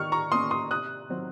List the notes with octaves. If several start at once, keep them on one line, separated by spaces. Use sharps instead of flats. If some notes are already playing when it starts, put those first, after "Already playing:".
Already playing: D#3 C#6 F6
A#5 C#6
A#3 C#4 C6 D#6
C6 D#6
C3 D#6 F#6
D#3 F#3 C4